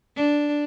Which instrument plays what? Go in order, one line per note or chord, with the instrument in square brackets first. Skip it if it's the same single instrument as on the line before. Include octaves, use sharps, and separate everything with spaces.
[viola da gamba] D4